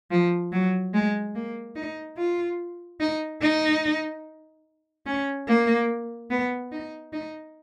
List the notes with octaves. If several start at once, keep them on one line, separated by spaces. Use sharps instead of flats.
F3
F#3
G#3
A#3
D#4
F4
D#4
D#4
C#4
A#3
B3
D#4
D#4